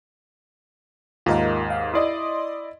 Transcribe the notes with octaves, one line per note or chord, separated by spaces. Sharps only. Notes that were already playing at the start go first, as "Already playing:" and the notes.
D#2 G#2 F4 A#4 D#5
F5
E4 D5 D#5 C6 D#6